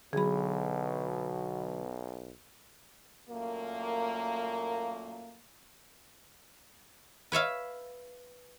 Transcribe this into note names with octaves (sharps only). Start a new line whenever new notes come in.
B1 B2 D3 F#3 G#4 B5
F#2 A#2 A3 A#3
B4 C#5 E5 F5